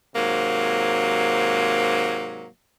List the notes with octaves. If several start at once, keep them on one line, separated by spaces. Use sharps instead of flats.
G#2 C3 F#3 A#3